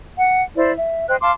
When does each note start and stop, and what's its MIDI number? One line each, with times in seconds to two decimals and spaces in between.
0.18 0.42 78
0.56 0.71 64
0.56 0.71 72
0.56 0.71 74
0.78 1.07 76
1.08 1.16 72
1.08 1.16 75
1.08 1.16 79
1.08 1.16 90
1.21 1.31 77
1.21 1.31 81
1.21 1.31 84
1.21 1.31 86